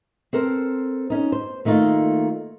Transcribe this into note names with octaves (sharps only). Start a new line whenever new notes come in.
C4 A4 A#4 C5
C#4 D#4
C5
D#3 A3 A#3 D#4 F4